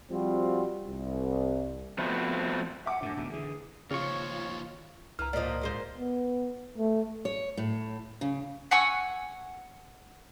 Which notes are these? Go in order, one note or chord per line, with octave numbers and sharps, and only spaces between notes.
F3 G3 C4 F4 F#4
C2
F3 A3 B3 C4 F4 F#4
E5 F#5 G#5 D6
F#2 A2 D4
D1 B1 B2
D3 E3 G#4
D#2 C#3 F3 F4 C#5 C#6
C#2 E3 A#5 F6
A#2 F3 D5 D#5
A#2 G#3 C5
B3
A3
C#5
A2
C#3
F#5 G#5 C#6 E6